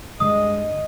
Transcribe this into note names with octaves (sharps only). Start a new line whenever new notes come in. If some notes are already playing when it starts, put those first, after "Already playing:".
G2 D3 G3 G#3 D#5 D#6